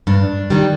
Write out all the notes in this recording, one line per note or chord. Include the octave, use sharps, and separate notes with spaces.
G2 D4
D#3 G3